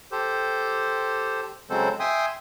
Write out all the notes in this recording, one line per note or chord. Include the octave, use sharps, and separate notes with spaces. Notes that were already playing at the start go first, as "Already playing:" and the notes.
G4 A4 C5
C#3 F#3 G#3 C4 A4 C5
E5 G5 G#5 C6 D#6